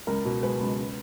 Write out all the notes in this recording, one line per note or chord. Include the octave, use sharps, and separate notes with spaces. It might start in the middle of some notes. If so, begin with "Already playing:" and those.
C#2 A#4
B2
G#3 B4
C#2
C#3